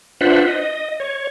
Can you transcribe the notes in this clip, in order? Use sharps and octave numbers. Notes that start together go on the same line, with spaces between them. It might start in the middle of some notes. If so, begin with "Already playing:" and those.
D4 F4 B4 C5 E5 F#5
D#5
C#5